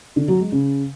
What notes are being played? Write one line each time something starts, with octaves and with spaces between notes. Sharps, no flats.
D3
F#3
G#3
C#3